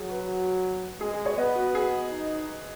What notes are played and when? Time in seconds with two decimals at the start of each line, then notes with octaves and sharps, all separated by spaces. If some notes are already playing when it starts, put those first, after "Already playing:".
Already playing: F#3 G#4
0.09 F#4 B4
1.01 G#3 G#4
1.14 G#4
1.25 G#4 C#5
1.37 B3 B4 D#5
1.55 F#4 B4
1.75 G#4
2.11 D#4